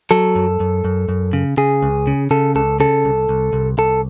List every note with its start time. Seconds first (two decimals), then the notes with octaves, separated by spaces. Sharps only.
0.11 F#3 A4
0.36 F#2
0.60 F#2
0.85 F#2
1.09 F#2
1.33 C#3
1.57 C#3 G#4
1.83 C#2
2.07 C#3
2.31 C#3 A4
2.56 C#2 A4
2.80 C#3 A4
3.05 C2
3.29 C2
3.53 C2
3.78 C2 A4